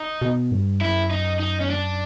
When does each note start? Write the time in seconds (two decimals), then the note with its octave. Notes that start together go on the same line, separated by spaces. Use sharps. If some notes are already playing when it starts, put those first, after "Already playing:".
Already playing: D#4
0.22 B2
0.51 G2
0.81 F#2 E4
1.11 D#4
1.40 D#4
1.61 C#4
1.70 D4